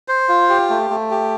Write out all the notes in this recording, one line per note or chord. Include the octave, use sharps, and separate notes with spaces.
C5
F4
G4
A3
A3
G4